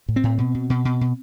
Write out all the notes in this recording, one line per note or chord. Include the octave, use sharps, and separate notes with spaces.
A2
C4
A2
B2
B2
B2
B2
B2